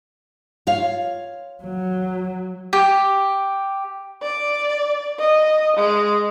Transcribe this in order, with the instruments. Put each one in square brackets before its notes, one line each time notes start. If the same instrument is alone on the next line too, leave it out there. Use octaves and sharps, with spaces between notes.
[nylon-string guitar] F4 C#5 F5
[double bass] F#3
[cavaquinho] G4
[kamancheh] D5
D#5
G#3